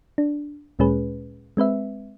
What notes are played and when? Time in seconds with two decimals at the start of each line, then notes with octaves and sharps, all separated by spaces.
0.18 D4
0.79 D2 A#2 G#3 C#4 G#4 B4
1.57 G#3 C4 B4 E5